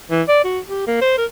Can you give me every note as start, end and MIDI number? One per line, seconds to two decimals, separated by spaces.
0.11 0.22 52
0.29 0.40 74
0.44 0.60 66
0.68 0.85 67
0.87 1.01 58
1.02 1.14 72
1.18 1.25 70